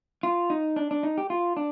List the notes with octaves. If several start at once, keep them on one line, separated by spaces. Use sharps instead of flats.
F4
D#4
D4
D4
D#4
G4
F4
D4